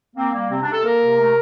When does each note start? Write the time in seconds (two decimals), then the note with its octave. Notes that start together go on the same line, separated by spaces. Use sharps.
0.15 A#3 C4
0.33 G3 A#3
0.50 C3 C4
0.61 D4
0.66 C3
0.72 A4
0.83 A#3 A#4
1.00 C3
1.18 A3